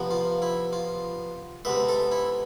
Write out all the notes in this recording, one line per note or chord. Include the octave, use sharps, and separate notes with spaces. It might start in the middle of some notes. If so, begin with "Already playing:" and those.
Already playing: C3 F3 B3
F4
E4
F4
C3 G#3 B3 E5
A4
E4